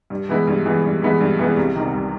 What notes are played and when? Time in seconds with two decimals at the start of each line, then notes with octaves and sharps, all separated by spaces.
0.10 G2
0.29 E3 G#3 B3 E4
0.47 G2
0.65 E3 G#3 B3 E4
0.84 G2
1.02 E3 G#3 B3 E4
1.21 G2
1.39 E3 G#3 B3 E4
1.57 C2
1.75 C3 D#3
1.94 C2